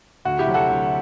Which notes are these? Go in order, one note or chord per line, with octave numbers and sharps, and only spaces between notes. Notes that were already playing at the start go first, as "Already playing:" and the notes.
D2 F#4
E4 G4
C3 F#3
F#4 A4
D2